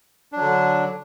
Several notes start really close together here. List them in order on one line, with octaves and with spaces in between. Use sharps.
D4 F#3 D3